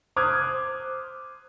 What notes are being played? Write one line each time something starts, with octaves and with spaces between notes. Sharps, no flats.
C5 D6 D#6 F6 F#6 G#6